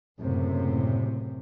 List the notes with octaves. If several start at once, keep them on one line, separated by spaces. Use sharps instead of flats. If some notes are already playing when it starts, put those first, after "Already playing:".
F#1 F#2 A2 C3